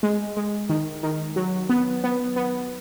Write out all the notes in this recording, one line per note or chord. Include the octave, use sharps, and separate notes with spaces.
G#3
G#3
D#3
D#3
F#3
B3
B3
B3